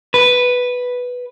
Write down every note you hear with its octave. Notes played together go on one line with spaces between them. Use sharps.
B4